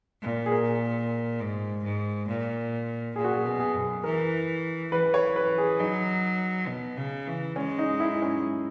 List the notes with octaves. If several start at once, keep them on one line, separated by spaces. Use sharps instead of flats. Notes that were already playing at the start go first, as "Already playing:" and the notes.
A#2
G#4
A#4
G#2
G#2
A#2
A#2 G#4
F#4
G#4
B2
G#4
F#2
E3 A#4
E3 B4
C#5
B4
G#4
F#3 D#4
B2
C#3
E3
G#3 C#4
D#4
E4
C#4